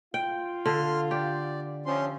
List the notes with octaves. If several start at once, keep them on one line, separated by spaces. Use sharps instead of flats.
F4 G5
D3 C6 F6
G4 D5
C3 F3 C#4 C6